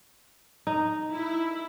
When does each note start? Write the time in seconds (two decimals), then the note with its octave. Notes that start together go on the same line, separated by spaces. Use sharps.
0.67 D#4
1.13 E4